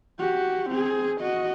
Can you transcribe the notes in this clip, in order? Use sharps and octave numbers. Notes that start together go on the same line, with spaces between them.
F#4 G4
C4 G#4
F#4 D#5